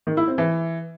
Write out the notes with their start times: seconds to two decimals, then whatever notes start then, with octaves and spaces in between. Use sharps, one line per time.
0.07 D#3
0.17 E4
0.28 C4
0.38 E3